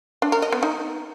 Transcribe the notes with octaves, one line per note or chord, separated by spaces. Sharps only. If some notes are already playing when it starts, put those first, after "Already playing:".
D4
A#4
D#5
B3
D#4